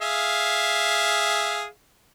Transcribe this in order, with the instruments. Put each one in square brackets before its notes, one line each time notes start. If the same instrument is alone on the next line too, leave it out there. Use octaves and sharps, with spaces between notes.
[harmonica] G#4 E5 F5